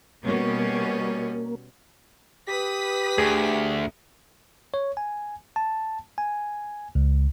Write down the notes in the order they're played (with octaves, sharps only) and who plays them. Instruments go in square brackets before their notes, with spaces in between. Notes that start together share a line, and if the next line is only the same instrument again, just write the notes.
[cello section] B2 G3 C#4 [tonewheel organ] A#3
[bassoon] G4 [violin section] B4 D#6 B6
[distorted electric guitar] D2 [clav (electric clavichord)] G#4
[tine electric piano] C#5
G#5
A5
G#5
C#2